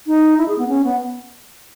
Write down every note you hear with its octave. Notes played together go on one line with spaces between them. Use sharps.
D#4
E4
G#4
B3
C#4
B3